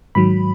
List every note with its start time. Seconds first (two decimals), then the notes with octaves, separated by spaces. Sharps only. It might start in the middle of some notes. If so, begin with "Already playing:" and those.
0.15 G#2 D#3 F#3 B5